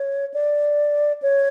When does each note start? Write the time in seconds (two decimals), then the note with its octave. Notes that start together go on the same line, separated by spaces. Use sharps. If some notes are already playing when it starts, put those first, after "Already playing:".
Already playing: C#5
0.34 D5
1.22 C#5